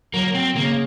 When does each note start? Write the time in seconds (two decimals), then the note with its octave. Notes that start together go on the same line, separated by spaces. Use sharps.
0.13 F#3 A#3
0.35 C4
0.56 C#3 A#3